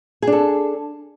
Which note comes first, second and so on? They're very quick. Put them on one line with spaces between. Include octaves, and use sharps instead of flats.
G#4 D4 A4